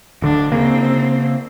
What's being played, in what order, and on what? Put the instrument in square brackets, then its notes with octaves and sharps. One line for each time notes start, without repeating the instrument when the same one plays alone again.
[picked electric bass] D1 D3 [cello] D4
[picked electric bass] C#3 A#3 [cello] C4